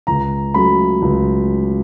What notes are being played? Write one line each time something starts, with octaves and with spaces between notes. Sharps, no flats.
C#2 A#5
C#3 F#3 A3 B5
C#2